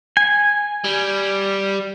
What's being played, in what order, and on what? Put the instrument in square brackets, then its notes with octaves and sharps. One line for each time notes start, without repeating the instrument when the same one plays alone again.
[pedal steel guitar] G#5
[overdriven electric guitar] G3